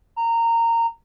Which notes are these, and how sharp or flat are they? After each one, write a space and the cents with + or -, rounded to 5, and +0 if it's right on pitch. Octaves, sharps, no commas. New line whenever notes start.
A#5 -20